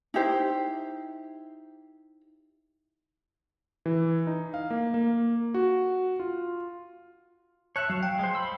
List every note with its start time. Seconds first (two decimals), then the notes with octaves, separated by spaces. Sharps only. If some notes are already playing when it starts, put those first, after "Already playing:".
0.14 D#4 E4 G4 C5
3.86 E3
4.27 D#4
4.54 F5
4.70 A#3
4.94 A#3
5.54 F#4
6.20 F4
7.76 C#5 E5 A5 F#6
7.90 F#3 F5
8.03 G5
8.19 G#3 C5
8.35 B5 C6 E6